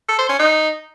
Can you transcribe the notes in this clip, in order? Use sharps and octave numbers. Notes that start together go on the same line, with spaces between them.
A4
C5
C#4
D#4